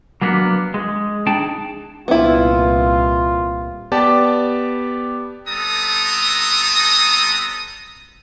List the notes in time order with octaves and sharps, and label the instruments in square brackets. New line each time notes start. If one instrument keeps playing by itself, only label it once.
[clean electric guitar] F#3 A#3 B3 D4
G#3
D4 D#4 G#4 G5 A5
[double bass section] C2 A#2 [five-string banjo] B3 E4 [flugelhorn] F4
[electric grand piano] B3 G4 D5 A5
[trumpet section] G3 B3 C4 A4 A#5 D#6